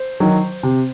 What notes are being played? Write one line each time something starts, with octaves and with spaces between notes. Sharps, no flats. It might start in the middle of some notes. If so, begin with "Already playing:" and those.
Already playing: C5
D#3 F#3
C3